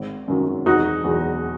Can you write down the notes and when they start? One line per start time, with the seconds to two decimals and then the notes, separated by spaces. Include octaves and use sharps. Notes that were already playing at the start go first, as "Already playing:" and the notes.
Already playing: G#1
0.28 F#2 D#3 F#3
0.66 E1 D#4 F#4
1.04 E2 B2 F#3